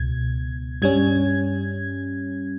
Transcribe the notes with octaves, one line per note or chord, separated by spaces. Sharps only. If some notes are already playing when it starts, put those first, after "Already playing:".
Already playing: C#2 B2 G#6
G2 G3 C#4 G#6